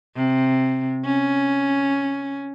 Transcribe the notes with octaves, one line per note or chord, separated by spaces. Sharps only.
C3
C#4